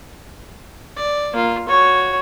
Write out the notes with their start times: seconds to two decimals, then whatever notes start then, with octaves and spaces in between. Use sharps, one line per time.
0.97 D5
1.33 A#3 F4
1.69 F#4 C#5